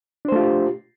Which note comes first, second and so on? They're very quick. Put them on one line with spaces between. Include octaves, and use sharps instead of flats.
D4 C5 A3 F4 G4